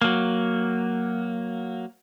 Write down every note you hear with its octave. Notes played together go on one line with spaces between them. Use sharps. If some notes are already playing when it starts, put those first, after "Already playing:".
F#3 A#3